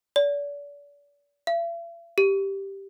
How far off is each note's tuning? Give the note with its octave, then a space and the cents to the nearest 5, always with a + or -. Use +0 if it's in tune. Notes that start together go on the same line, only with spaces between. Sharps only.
D5 -35
E5 +45
G4 +0